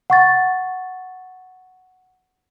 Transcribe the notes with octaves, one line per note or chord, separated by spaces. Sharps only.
F#5 C#6 A6